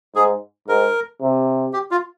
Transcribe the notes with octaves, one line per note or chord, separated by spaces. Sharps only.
G#2 G#4
G#2 A#4
C3
G4
F4